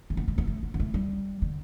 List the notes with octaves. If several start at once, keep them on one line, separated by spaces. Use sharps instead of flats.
A3
B3
A3
B3
A3
B3
B3
A3
G3
D3